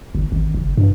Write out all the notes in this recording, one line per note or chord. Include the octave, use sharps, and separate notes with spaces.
G1
G#1
F#1
G2